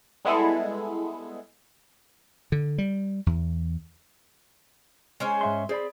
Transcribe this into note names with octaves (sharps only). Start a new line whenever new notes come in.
G3 G#3 B3 E4 G#4 A4
D3
G3
E2
G#3 C#4 C5
G#2 E5 C6
C4 G#4 D5 B5